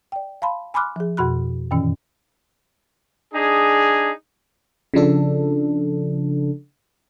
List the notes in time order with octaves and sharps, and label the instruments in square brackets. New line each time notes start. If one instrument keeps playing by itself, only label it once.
[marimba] D5 G5
F5 A5 B5 C6
G#5 B5 C6 D6 F6 F#6
F3 G#4
F2 B2 F#4 B5 F#6
F#2 A#2 D#3 E3 C#4
[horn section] D4 D#4 G#4
[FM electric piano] C#3 F3 D4 A4